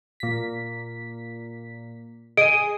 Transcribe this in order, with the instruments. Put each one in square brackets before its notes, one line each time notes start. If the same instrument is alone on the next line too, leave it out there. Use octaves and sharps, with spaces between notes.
[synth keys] A#2 B6
[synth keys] G#4 D#5 [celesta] D7 D#7